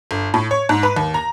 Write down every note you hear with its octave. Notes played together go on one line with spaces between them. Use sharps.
G1
A2
C#5
G#2
B4
D#2
A#5